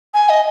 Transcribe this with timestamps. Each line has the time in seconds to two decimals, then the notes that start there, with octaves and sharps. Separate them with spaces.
0.14 G#5
0.29 D#5